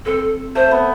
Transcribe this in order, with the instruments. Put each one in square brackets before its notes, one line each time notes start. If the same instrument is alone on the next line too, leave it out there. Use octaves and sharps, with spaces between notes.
[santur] C4 [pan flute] A4
[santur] A3 [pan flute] C5
[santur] B3